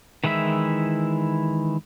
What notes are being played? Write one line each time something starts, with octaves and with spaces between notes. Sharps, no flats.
D#3 E3 G#3 E4 E5